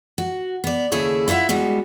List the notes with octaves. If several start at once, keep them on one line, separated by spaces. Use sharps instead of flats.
F#4
B3 D5
D#2 C#3 E4 G#4 A4 C#5
E4 F4 C5 E5 F#5
G3 G#3 B3 F#4